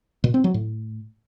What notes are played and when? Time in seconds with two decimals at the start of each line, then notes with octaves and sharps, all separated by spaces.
0.24 A#2
0.34 C4
0.44 F#3
0.54 A2